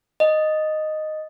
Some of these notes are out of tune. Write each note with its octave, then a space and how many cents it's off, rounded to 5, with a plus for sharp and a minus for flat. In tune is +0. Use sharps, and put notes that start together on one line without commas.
D#5 -5